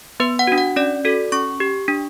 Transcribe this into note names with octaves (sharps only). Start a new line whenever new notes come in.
B3 B4
F#5
D4 F#4
F#5
C#4 D5
F#4 A4
C#4 C#6
G4
D4